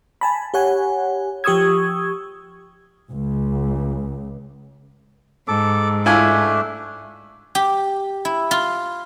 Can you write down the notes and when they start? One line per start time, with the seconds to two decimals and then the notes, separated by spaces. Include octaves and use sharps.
0.21 G#5 A5 B5
0.54 G4 C#5 F#5 G#5
1.44 F3 G4 C#6 D#6 E6 G#6
3.11 C#2
5.48 G#2 A4 D6
6.06 A3 D4 E4 F4 G#5
7.55 G4
8.25 E4
8.51 F4